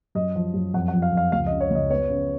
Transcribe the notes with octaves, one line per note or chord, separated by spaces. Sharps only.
F#2 D#5
F3
F#2
F2 F#5
F#5
F3
F5
F2 F5
C#2 F5
D#5
C#3
C#5
C#2 D#5
B3 C#5
C#3